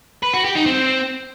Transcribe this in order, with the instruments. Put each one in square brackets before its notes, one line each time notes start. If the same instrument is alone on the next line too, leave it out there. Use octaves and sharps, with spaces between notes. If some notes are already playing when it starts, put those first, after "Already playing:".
[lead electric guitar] B4
F#4
G4
D#4
C4